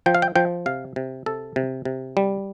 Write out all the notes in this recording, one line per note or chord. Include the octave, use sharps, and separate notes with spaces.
F3 G5
F5
G5
F3 G5
C3 F5
C3
C3 A4
C3
C3
G3